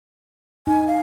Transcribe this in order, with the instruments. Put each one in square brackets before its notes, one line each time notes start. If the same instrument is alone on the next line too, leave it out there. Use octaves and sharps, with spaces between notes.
[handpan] D#4 [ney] G#5
[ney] F5